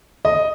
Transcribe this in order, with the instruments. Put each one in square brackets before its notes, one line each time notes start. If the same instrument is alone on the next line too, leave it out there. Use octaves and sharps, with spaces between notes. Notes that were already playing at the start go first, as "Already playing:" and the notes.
[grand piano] D#5